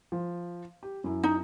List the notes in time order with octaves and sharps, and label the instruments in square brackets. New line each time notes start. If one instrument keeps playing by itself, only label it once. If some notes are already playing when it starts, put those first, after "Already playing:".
[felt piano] F3
G4
F#2 E4
[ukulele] D#4